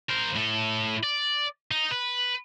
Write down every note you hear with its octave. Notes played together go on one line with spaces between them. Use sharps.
A#4 C5
A2 A4
D5
D#4
B4